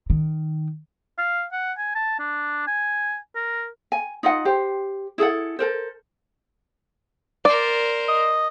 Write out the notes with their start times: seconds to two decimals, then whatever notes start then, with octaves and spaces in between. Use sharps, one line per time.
0.10 D#3
1.18 F5
1.52 F#5
1.78 G#5
1.95 A5
2.19 D4
2.67 G#5
3.35 A#4
3.92 G#5
4.23 D#4 F4 D#5 F#5
4.45 G4 C5
5.18 E4 G#4 A4 F#5
5.59 A4 A#4 C5
7.45 A#4 C5 D5
8.08 D#5